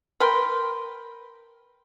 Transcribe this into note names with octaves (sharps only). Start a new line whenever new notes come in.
A#4 B4 G5 C6